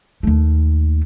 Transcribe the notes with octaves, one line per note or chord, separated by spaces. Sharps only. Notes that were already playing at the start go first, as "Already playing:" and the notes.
D#2 A3